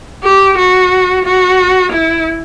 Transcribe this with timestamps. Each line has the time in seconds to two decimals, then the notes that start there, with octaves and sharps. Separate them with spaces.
0.24 G4
0.58 F#4
1.25 F#4
1.92 E4